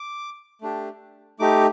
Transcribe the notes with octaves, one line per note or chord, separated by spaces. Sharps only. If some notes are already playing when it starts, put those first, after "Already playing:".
Already playing: D6
A3 D4 G4
A3 D#4 G4 D6